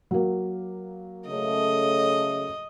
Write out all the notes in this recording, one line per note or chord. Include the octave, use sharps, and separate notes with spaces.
F#3 A#3
C#3 A3 D#5